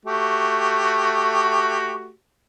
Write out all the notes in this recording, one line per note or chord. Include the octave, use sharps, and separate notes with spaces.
A3 F#4 G4